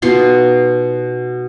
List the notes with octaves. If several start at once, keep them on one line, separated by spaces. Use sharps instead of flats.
B2 D#4 F4 C6